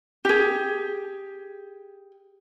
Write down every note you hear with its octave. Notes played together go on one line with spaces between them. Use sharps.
G4 G#4